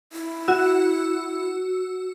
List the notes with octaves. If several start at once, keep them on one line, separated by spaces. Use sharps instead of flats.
E4
F#4 E6